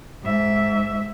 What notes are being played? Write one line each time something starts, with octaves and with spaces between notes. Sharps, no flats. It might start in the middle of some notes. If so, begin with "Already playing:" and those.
G#2 E5